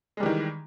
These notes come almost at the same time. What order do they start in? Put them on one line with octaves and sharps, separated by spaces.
G#3 G3 E3 D#3